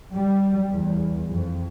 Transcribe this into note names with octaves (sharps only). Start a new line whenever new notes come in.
G3
E2
F2